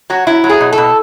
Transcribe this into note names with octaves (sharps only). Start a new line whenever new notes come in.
F#3 F#4
F#3 E4
F#3
G#4
B2
A4
B2